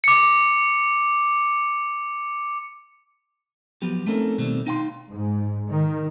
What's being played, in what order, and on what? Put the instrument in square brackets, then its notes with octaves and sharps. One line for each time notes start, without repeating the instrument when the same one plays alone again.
[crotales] D6 C#7
[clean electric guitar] F3 F#3 B3 G4
A3 C4 C#4 D#4 A4 A#4
B2 D#3 G3 A3 C4
D#4 F5 G5 G#5 C6
[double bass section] G#2
D#3